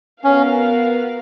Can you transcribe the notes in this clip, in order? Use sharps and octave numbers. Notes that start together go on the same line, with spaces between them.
B3 C#4 F#4 A#4 F5